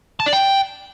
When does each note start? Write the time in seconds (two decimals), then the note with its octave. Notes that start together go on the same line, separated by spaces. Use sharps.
0.20 A5
0.26 D5
0.33 G5